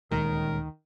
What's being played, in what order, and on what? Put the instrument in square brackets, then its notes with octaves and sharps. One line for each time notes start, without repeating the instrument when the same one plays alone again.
[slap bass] D#1 G#3 [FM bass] D2 [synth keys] D#3 [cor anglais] A#4